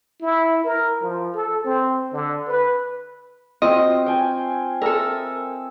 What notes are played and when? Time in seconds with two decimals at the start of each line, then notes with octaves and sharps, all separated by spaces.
0.21 E4
0.64 A#4
1.02 F3
1.34 A4
1.64 C4
2.12 D3
2.48 B4
3.62 C4 F4 F#4 D#5
4.06 G5 G#5
4.82 A4 A#4 E5 D#6